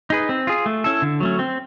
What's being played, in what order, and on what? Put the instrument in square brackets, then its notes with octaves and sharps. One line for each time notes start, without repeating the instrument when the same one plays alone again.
[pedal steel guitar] D#4 G#4 B4
C4
F4 G#4
A3
C#4 E4 A4
D3
F#3 A3 C#4
C4